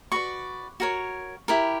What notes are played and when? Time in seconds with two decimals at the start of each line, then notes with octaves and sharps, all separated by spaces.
0.12 F#4 B4 D5 C#6
0.80 F#4 A#4 C#5
1.48 E4 G4 A#4